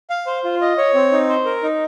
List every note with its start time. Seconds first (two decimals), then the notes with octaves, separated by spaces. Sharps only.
0.10 F5
0.27 C5
0.44 F4
0.61 D#5
0.78 C#5
0.94 C4
1.12 D#4
1.29 C5
1.45 A#4
1.63 D#4